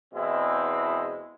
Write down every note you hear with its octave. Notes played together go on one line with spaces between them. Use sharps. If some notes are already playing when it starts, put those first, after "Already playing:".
E2 B2 G#3 C4 E4